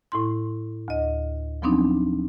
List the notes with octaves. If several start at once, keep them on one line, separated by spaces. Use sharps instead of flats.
A2 E4 C6
D2 D#5
F3 F#3 B3 C4 D4 D#4